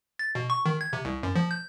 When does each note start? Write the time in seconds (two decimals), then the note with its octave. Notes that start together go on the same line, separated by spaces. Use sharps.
0.19 A6
0.35 B2
0.50 C#6
0.66 D#3
0.81 G#6
0.93 C3
1.05 C2
1.23 F#2
1.36 F3
1.51 G6